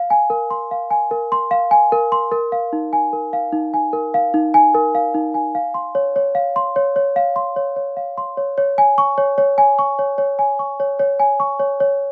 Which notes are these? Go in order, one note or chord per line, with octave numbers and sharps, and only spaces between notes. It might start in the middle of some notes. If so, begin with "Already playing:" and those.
Already playing: F5
G#5
A#4
C6
F5
G#5
A#4
C6
F5
G#5
A#4
C6
A#4
F5
D#4
G#5
A#4
F5
D#4
G#5
A#4
F5
D#4
G#5
A#4
F5
D#4
G#5
F5
C6
C#5
C#5
F5
C6
C#5
C#5
F5
C6
C#5
C#5
F5
C6
C#5
C#5
G#5
C#6
C#5
C#5
G#5
C#6
C#5
C#5
G#5
C#6
C#5
C#5
G#5
C#6
C#5
C#5